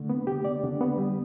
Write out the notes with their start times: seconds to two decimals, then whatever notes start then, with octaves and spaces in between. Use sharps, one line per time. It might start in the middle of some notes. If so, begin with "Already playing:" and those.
Already playing: D3 A3
0.09 B3
0.27 G4
0.45 D5
0.63 D3
0.81 B3
0.98 G3